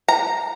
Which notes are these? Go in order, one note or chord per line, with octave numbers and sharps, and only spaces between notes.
A#5